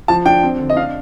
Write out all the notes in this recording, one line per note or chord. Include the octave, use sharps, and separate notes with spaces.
F3 A5
D4 G5
C4
D3
D#5
D4 F5